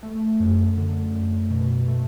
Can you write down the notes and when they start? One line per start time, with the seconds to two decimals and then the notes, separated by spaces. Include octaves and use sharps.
0.03 A3
0.40 F#2
0.78 D3
1.14 F#2
1.51 B2
1.88 A3